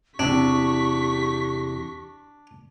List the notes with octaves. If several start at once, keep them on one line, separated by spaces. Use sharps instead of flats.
E2 C3 D4 G4 C#6 B6